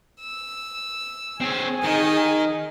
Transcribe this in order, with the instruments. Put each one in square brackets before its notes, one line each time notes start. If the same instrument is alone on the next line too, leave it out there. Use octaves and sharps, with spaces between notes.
[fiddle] E6
[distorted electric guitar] C4 C#5 [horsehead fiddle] G#4 G#5
[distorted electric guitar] D#3 [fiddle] D#5